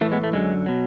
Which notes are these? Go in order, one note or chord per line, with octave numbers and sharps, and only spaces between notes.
A2 E3 A3
G#3 B3
A3
F#2 D3 F#3 G#3
B2 F#3